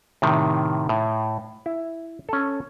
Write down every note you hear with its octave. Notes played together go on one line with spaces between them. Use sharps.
A2 C3 D#3
A2
E4
C#4 A4